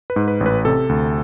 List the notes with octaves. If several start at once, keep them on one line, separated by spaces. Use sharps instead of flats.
B4
G#2
B4
A1
B4
C3 A4
D2